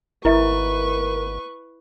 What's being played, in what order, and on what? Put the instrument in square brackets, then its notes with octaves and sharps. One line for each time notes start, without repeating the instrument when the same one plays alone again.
[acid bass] G#1 [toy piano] E4 E5 [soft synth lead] A#4 [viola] B4 C#6